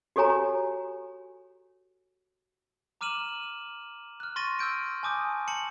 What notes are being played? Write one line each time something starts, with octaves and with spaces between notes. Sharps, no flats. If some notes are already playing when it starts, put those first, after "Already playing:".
F#4 G4 A4 C#5 G#5 A#5
A#5 D6 F6 D#7 E7 F#7
F6 F#6
C6 C#6 A6 A#6 D#7
E6 F6 G6 D7
G#5 A5 D6 D#6 G6
A5 C#7 F#7